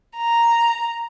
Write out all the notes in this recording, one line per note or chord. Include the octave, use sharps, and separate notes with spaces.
A#5